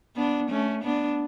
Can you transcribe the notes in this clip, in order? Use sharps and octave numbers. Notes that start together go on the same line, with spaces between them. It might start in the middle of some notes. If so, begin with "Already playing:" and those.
B3 D4
A3 C#4
B3 D4